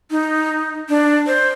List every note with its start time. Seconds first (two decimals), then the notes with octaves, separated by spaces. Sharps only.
0.11 D#4
0.89 D4
1.27 C5